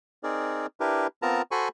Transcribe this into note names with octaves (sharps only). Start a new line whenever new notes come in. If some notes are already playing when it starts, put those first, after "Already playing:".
C4 D#4 G#4 A#4 D5
D4 E4 G4 A#4 B4
B3 C4 F4 A#4 A5 A#5
F#4 A4 C5 G#5 B5 C#6